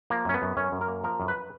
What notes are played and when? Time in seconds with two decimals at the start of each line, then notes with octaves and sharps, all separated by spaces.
0.10 F3 A#3
0.25 F#2 C#4
0.34 B3
0.42 F#2
0.57 F#2 C#4
0.72 F#2
0.81 A#4
0.88 A#3
1.04 F3 A#4
1.20 F#2
1.28 B4